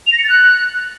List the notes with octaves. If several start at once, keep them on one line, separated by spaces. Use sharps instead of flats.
F7
A#6
C#7
A6
F#6